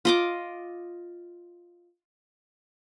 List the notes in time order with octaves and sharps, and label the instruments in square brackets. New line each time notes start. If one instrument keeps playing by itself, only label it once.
[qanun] F4 D#5 D6